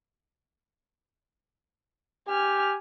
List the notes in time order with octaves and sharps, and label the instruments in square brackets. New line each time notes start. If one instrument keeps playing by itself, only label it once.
[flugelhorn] G4 [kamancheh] G#5 F6